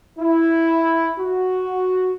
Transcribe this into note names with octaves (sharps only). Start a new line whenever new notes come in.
E4
F#4